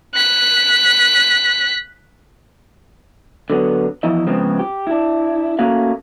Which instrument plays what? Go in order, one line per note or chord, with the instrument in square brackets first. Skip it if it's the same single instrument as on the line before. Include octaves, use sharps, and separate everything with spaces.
[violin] F#6 B6
[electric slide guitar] D3 F#3 B3
E2 F3 E4 D#5
C#3 F3 G#3 B3 C4
G4
D4 E4
A3 A#3 C#4 F#4 F5